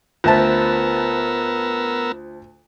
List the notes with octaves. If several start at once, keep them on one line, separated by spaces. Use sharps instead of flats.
D2 B3 F4 A#4 C5 E5 A5 E6